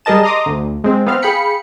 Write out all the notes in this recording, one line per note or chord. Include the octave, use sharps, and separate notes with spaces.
G3 G#4 A#4 D#5 A5 E7
D#5 A#5 C6 D6 D#6
D2
G#3 C4
B3 C4 F5 F6
G#4 F5 G5 B5 C#7